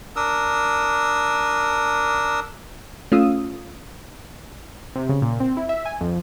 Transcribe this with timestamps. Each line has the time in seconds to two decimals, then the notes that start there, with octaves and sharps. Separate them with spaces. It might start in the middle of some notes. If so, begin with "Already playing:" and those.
0.16 D4 A#4 D#6 E6
3.12 A3 C#4 F4 F5 D#6 E6
4.96 C3
5.09 C#3
5.22 A#2
5.40 C4
5.57 E4
5.69 E5
5.86 G#5
6.01 F2